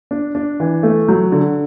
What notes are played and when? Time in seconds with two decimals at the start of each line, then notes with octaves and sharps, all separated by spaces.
0.11 D4
0.35 D4
0.60 E3
0.83 A3
1.09 F#3
1.32 D3